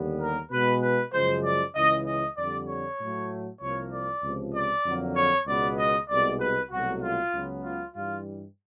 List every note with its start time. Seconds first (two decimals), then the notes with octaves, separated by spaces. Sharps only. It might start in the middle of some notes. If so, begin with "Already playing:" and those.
Already playing: D#2 D3 G3 B3
0.21 A#4
0.52 B2 G#3 B3 B4
0.82 B4
1.13 F#2 C#3 F3 G#3 C5
1.45 D5
1.75 C#2 C#3 E3 D#5
2.06 D#5
2.37 F2 D3 G3 D5
2.68 C#5
3.00 A2 F#3 A3
3.61 C2 C3 F3 A#3 C#5
3.93 D5
4.23 C#2 C3 F3
4.55 D5
4.85 F2 D3 F#3 A#3
5.16 C#5
5.47 C#2 B2 G#3 B3 D5
5.78 D#5
6.09 C2 B2 G#3 B3 D5
6.41 B4
6.71 C2 B2 F#3 A3 F#4
7.02 F4
7.33 C#2 C#3 F#3 B3
7.64 F4
7.95 G2 E3 G3 F4